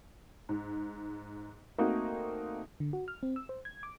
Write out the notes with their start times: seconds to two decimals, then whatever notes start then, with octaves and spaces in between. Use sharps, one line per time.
0.49 G#2
1.78 A3 A#3 C4 D#4 F#4
2.80 D3
2.93 F#4
3.08 F6
3.23 C4
3.36 E6
3.49 C5
3.65 G#6
3.83 D6